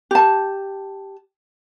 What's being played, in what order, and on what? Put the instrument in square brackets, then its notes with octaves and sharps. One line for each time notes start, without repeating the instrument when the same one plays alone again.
[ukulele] G4 A5